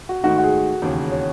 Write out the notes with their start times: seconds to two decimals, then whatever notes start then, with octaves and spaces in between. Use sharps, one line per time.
0.09 F#4
0.23 G#2 D#3 A3 D#4 F#4
0.38 F#4
0.43 G#4
0.82 E1 D#2 C#3
1.12 C#5